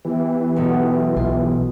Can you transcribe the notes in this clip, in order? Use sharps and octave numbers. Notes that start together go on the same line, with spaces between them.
E3 B3 E4 G4
B1 B2 A3
B1 F4